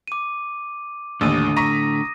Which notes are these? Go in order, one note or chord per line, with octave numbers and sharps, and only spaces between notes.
D6 D#7
A1 D#2 A2 D3 D#6 E6 D#7
A#5 C#6 A#6 B6 D#7